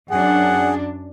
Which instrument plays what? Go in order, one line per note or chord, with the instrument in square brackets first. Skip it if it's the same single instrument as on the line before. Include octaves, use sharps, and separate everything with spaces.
[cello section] F#2 D4 [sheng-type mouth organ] G#4 [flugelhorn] F#5